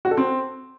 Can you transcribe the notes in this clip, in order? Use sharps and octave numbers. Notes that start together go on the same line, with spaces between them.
F#4
A4
C4